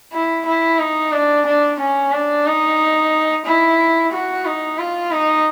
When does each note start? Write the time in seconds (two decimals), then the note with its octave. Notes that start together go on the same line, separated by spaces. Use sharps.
0.12 E4
0.46 E4
0.79 D#4
1.12 D4
1.46 D4
1.79 C#4
2.12 D4
2.45 D#4
3.45 E4
4.12 F#4
4.45 D#4
4.79 F4
5.11 D#4